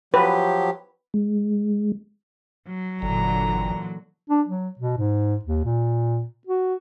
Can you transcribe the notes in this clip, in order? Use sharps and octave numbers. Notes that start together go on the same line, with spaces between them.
F3 F#3 G4 B4
G#3
F#3
G1 A#2 D3 E3 A#5
D4
F#3
B2
G#2
D#2
A#2
F#4